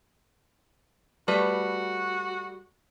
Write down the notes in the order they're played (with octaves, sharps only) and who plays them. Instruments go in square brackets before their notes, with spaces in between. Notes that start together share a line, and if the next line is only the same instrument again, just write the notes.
[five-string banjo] G3 A3 B4 [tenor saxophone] F#4